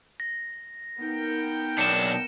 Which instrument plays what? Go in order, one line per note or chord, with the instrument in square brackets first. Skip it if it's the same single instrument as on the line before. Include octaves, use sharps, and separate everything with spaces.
[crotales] A#6
[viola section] B3 A#4 G5 [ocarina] D#4
[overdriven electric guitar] B1 D4 [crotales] C#7 E7